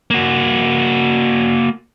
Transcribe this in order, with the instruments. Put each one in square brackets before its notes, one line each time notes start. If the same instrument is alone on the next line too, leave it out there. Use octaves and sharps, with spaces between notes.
[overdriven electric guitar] A#3 F#4